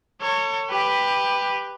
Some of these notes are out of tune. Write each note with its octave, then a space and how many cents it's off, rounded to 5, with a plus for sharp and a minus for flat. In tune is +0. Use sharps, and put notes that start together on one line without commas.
A4 +40 C#5 +0
G4 +15 B4 +0